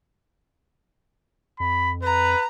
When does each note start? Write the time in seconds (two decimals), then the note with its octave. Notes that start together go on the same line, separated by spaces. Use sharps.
1.60 F2 B5
2.03 B4 A#5